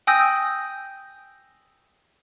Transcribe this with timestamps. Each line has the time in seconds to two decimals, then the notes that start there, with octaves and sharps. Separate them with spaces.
0.07 G5 G#5 D#6 E6 G6 A#6